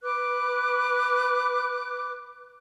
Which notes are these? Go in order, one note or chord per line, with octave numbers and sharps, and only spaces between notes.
B4 D6 F#6